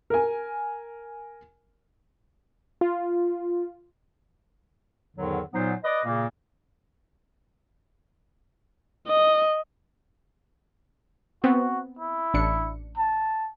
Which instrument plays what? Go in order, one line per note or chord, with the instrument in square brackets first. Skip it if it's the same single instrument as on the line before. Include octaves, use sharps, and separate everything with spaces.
[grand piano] A#4 G#5
[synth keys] F4
[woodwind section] E2 G#2 D3 D#3 F#3
A#2 F#3 B3 D#4 C5
B4 D5 D#5
A#2 C#3 A#3
[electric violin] D#5
[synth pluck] B3 C4 [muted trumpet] F#4
[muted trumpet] E4
[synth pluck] A1 D4 C#7
[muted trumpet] A5